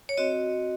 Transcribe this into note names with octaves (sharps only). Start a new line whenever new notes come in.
C#5
C4 F#4 D#5